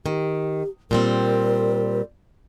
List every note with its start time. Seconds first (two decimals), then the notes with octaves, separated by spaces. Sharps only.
0.06 D#3 G4
0.91 A#2 G3 C4 A#4